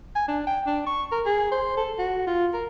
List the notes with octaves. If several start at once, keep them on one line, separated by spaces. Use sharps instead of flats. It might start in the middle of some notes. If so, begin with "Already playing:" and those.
G#5
D4
G5
D4
C#6
A#4
G#4
C5
A4
F#4
F4
A#4